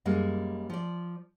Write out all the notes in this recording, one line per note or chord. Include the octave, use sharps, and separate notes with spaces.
F#2 G3 G#3 A#3
F3 D5